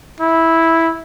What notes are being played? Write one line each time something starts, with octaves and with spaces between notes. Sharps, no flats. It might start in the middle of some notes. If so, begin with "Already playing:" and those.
E4